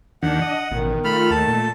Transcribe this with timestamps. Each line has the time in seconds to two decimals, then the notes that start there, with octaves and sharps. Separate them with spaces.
0.23 D#2 D#3 D4 F#5
0.42 D#5
0.71 A1 B2 D#3
1.04 A3 F4 B5 F6
1.31 D#2 A5
1.48 A#2